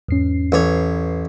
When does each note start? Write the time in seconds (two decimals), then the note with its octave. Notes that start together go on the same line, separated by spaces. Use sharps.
0.08 E2 G#2 C#4 C7
0.52 A1 B4 C#5